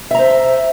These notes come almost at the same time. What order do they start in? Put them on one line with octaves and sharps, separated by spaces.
E5 A#5 C5